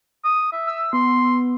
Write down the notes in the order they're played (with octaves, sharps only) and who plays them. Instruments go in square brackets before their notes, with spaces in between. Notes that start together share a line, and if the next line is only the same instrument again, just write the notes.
[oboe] D#6
E5
[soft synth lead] E6
[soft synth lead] B3 [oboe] C6